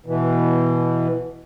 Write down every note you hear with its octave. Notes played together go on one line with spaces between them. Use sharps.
B2 E3